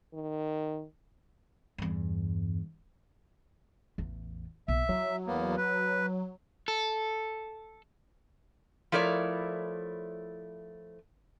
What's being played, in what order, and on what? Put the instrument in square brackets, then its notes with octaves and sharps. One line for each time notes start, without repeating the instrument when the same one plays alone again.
[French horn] D#3
[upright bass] E2 G2
A1 E2
[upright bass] B1 [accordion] E5
[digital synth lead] F#3 [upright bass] E4
[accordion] E2 A#3 B3
B4
[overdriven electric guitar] A4
[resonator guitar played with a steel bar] F3 A3 E4 A#4 C#5 D5